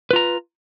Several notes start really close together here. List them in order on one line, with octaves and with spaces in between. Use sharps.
B4 F4 A#5